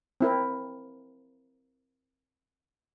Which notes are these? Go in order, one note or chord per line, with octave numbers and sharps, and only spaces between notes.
C4 E4 A#4